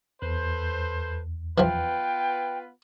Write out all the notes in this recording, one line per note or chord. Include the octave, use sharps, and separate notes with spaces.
E2 A4 B4 C5
E3 F3 B3 F4 B4 G5